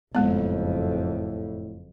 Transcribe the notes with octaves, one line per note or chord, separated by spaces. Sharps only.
F#1 F2 A2 G#3 B3